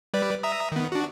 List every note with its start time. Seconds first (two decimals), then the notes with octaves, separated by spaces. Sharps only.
0.14 G3 B4 D5
0.43 E5 A#5 D#6
0.72 D#3 B3
0.92 D4 F#4